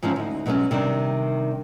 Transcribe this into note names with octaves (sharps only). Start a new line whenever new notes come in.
G#2 E3 F3 C4 C#4 D#4
D2 D#4
B2 F#3 G#3 C4 C#4
C3 D#3 G3 D4